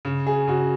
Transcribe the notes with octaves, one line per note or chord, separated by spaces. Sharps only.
C#3
G#4
C#3 F#4